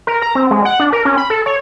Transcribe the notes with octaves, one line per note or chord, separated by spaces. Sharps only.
A#4
A#5
C4
G#3
F#5
D4
A#4
C#4
B5
A4
C#5